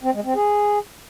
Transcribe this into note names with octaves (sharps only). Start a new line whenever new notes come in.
C4
G#3
C4
G#4